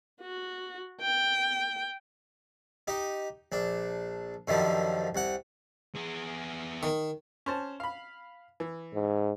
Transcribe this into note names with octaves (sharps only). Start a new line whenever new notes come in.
F#4
G5
D#4 G4
A#1 D4
F#2 D3 D#3 F3 G3
C2 F#5
B3 G#4
D#3
C#4 C5 A5
F5 B5
E3
G#2